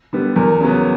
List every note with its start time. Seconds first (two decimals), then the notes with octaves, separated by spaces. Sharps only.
0.13 D3 G3 B3
0.36 E2 A#4
0.61 C#3 F#3 B3